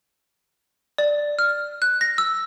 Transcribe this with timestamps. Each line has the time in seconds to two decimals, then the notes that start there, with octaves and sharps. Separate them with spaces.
0.98 D5
1.39 F6
1.82 F#6
2.01 A#6
2.18 E6